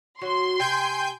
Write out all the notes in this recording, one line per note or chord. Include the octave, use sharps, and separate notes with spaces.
D#3 F#3 F#4 C6
C3 G5 G#5 G6